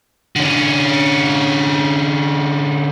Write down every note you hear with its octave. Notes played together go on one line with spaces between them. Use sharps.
D3 C#4